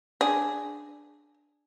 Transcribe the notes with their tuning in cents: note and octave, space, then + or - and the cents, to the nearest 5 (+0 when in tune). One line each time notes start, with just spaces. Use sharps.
D4 +0 G#4 +0